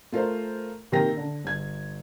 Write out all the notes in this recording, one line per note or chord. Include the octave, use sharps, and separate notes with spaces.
A3 F4 A#4 C5
C3 D#3 A#3 A#4 G5 A#6
D3
G1 G#6